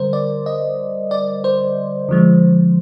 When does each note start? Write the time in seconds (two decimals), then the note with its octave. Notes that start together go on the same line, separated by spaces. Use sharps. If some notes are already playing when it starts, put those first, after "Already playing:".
Already playing: D3 G3 A#4 C5
0.13 D5
0.46 D#5
1.11 D5
1.44 C5
2.09 D3 F3 G#3